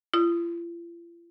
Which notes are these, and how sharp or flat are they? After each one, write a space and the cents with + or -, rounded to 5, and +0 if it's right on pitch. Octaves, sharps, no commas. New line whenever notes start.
F4 -45 D#6 +0